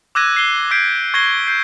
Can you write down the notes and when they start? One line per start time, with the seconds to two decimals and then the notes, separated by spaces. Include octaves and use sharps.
0.15 D6 E6 F#6 G#6 A#6 D#7
0.36 C7 G7
0.71 D6 G6 G#6 B6 C7 D7
1.14 C#6 G#6 A#6 C7 G7
1.47 G6 C7